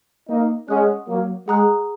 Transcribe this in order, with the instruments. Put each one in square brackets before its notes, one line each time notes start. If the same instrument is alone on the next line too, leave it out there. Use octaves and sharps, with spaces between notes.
[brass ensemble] A#3 D#4
[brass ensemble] G#3 C#4 [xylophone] F#5 D#6 F#6
[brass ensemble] F#3 A#3
[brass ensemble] G#3 [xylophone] G#4 F#5 A#5 D#6 F#6